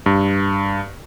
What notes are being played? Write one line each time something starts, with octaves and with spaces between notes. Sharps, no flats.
G2